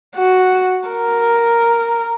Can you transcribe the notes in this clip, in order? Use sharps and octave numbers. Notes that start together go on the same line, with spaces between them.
F#4
A#4